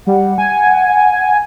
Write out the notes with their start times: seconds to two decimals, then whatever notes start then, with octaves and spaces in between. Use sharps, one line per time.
0.07 G3 F#5
0.38 G#5